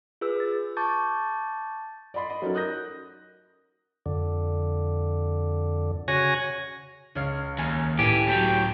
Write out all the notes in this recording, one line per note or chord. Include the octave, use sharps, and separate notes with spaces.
F4 G#4 B4 E6
A6
A5 C#6 D6 G6 A6
D5 D#5 B5 C6
D#5
F#3 C#4 D#4 A4 A#4
D#6 F#6 G6 A#6
F2 D3
C#3 F#4 C#5 G#5 A#6
C#2 C#5 F5
D#2 F5 G#5
A2 E3 G4 G#5
A2 F#3 G5 A5